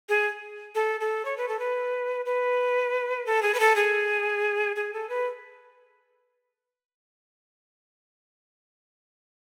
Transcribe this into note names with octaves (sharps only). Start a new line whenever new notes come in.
G#4
A4
A4
C#5
B4
A4
B4
B4
A4
G#4
B4
A4
G#4
G#4
A4
B4